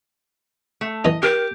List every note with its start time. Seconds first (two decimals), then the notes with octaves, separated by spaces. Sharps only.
0.81 A3
1.05 E3 D#4 D#5
1.23 G4 A#4